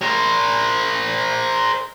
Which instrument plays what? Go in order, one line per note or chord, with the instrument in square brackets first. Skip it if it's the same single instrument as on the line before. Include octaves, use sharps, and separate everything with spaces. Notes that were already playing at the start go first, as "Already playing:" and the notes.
[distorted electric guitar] A#4 C5